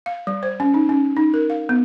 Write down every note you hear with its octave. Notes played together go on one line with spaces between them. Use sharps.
F5
G3
C5
C#4
D#4
C#4
D#4
A#4
F5
B3